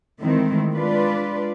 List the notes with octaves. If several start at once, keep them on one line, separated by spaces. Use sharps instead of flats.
D#3 E3 G#3 A3 C4 E4
G#3 D4 F4 B4 D5